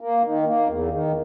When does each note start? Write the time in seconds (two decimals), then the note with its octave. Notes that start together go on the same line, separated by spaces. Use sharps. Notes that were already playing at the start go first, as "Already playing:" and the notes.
0.01 A#3
0.23 D#3
0.46 A#3
0.67 E2
0.90 D#3